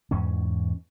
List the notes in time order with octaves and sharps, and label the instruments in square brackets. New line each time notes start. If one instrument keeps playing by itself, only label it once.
[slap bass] E2 G#2 C#4